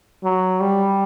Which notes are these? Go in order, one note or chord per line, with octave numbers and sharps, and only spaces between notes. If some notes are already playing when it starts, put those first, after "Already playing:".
F#3
G3